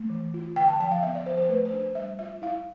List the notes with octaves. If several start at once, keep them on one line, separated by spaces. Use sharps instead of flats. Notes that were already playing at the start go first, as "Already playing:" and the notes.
Already playing: A3
E3
F4
D3 G5
A5
F3 G5
F5
B3 E5
D5
F3 C5
C5
A3 B4
C5
D4
C5
G3 E5
F4 E5
E4 F5